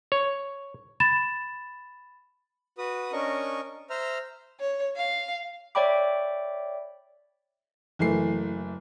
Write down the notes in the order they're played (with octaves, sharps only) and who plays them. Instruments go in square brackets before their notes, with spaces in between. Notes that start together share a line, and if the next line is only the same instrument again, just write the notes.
[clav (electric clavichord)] C#5
[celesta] B5 A6 E7
[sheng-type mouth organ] F#4 B4 D#6
C#4 D4 A#4 D#5 C#6
C5 E5 A#5 F6
[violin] C#5
F5
[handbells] C#5 D5 E5 G5 B5 D6
[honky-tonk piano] F#1 E3 A3 C7